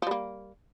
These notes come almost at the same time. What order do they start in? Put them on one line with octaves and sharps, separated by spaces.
F3 G3 A#3